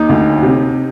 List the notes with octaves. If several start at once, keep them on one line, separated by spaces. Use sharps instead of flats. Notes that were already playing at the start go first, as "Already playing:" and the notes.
Already playing: D#2 D#4
D2
C3